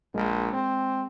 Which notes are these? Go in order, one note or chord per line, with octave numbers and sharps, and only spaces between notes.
A#1 G#3
C4